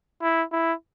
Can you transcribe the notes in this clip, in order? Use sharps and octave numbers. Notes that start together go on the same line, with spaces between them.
E4
E4